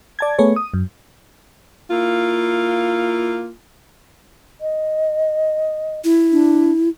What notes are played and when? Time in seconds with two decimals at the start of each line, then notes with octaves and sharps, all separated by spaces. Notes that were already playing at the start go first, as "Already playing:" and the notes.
0.19 D5 A5 G#6
0.39 A3 B3 G#4 C#5
0.56 D#6
0.74 F#2
1.90 A#3 E4 F4
4.61 D#5
6.04 E4
6.32 D4